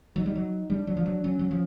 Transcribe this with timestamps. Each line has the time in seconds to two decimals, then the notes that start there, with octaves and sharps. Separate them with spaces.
0.16 F#3 D#4
0.26 G3
0.36 F#3
0.70 G3 D4
0.87 F#3
0.97 F3
1.06 F#3
1.23 F#3 C#4
1.39 F#3
1.51 F3